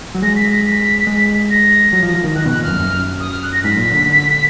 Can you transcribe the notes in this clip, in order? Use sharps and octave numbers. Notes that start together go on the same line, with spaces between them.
F#3
G#3 A#6
B6
A#6
B6
G#3
A#6
F#3
F3
F3
D#3
D#3 F#6
B2 F#6
A#2
F#2 F6
F#2
D#6
F6
F#6
A#6
G#2 B6
A#2
D3
D3